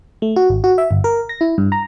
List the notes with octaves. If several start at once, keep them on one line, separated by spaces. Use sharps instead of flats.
A3
F#4
G#1
F#4
E5
G1
A#4
A#6
E4
G2
A#5